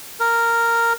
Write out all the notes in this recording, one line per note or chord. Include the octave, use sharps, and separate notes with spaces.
A#4